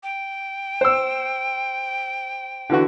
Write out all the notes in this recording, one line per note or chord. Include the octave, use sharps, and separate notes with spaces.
G5
C5 E6
D3 E3 F#4